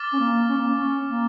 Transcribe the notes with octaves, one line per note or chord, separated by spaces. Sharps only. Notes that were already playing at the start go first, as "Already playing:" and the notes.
Already playing: D6 F6 A6
C#4
A#3
C#4
A#3
C#4
C#4
A#3